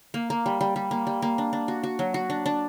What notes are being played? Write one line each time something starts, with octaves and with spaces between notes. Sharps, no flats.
A#3
A#3
G3
G3
G3
A#3
G3
A#3
D4
D4
F#4
F#4
F#3
F#4
D4
D4